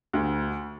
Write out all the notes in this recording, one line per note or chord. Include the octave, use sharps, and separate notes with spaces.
D2